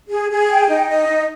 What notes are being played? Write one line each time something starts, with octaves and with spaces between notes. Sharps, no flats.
G#4
G#4
G5
D#4
D#5
D#4